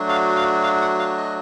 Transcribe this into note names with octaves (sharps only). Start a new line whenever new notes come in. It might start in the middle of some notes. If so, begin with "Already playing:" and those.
Already playing: F#3 A3 D4 F#4
F5
F5
F5
F#5
F5
D#5